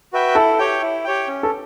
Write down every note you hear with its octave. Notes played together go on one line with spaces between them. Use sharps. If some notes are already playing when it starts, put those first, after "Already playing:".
F#4 B4 E5 G5
E4 A4
G4 C#5 G5
E4
G4 C#5 G5
C#4
A4